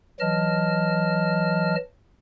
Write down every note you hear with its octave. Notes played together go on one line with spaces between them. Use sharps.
E3 F#3 D#5 A5 F6